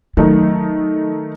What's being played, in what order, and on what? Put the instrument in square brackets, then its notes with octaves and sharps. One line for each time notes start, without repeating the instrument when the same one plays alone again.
[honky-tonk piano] D#3 A3 D#4 [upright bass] F#3